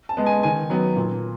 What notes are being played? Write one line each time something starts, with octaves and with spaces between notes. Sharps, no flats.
A5
G#3 B3
G#5
D#3 G#5
F#3 B3
A#2